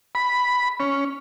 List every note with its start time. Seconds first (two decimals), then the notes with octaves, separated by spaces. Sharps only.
0.15 B5
0.80 C#4